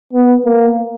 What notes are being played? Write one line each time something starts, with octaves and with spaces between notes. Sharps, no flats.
B3
A#3